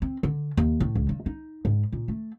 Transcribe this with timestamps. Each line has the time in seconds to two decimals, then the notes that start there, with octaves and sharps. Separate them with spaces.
0.02 C4
0.23 D3
0.57 D#2
0.80 A2
0.95 C#2
1.09 G2
1.26 D#4
1.65 G#2
1.93 A#2
2.08 A3